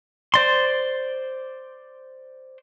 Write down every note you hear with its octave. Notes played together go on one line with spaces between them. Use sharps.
C5 D5 C6